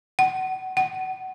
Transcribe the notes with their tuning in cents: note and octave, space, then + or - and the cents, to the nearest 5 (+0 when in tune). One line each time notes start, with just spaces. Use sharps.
F#5 +30
F#5 +30